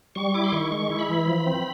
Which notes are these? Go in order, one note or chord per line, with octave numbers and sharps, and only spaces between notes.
G3 C#6
E4 D6
C6
D#3 C#6
G#3 C#6
E4
B5
E3
F3
C4